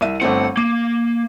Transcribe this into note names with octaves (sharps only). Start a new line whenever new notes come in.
C2 E5 D#7
G1 A3 C4 F#5
A#3 D6